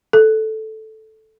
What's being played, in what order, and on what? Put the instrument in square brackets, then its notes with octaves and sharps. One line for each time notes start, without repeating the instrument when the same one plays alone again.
[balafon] A4